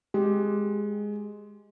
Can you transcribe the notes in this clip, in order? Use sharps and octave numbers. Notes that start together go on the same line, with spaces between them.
G#3 G4